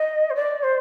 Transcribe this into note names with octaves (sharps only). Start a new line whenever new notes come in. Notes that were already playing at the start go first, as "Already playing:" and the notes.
Already playing: D#5
C5
D5
C5